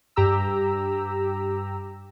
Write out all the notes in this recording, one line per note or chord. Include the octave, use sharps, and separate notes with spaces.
G2 G4 A#5 E6